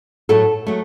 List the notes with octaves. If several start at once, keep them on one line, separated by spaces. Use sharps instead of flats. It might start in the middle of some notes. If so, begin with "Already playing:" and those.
A2 F#3 A3 A4
F#3 A3